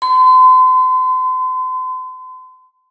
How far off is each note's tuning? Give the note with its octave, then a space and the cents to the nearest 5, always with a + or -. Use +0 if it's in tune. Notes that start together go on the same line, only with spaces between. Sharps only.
C6 -40